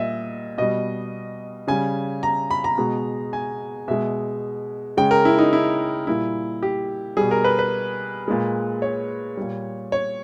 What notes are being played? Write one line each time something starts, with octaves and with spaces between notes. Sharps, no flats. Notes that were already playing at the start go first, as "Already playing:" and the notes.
Already playing: A#2 G3 D#5 E5
B2 G3 D#5
C#3 G3 G#5
A#5
B5
A#5
B2 G#3
G#5
B2 G#3 E5
C#3 G#3 G5
A#4
E4
D#4
E4
A#2 G3 E4
G4
B2 G3 G#4
A#4
B4
B4
A#2 G#3
C#5
A#2 G3
C#5